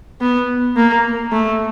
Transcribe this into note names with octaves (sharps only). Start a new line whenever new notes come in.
B3
A#3
A3